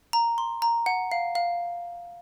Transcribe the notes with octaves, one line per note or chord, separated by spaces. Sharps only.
A#5
C6
A#5
F#5
F5
F5